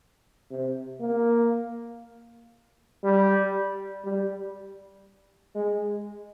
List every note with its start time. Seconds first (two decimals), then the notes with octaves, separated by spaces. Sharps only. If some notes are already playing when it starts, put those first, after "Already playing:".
0.51 C3
1.01 A#3
3.04 G3
4.05 G3
5.55 G#3